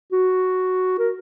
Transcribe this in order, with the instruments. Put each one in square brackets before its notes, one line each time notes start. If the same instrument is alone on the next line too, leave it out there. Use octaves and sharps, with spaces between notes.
[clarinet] F#4
A#4